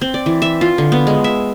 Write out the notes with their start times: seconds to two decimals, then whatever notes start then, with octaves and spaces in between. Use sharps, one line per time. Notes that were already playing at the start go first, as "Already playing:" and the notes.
0.01 C4
0.14 D5
0.26 E3
0.42 E5
0.61 F4
0.78 D3
0.92 B3
1.07 G#3
1.24 E5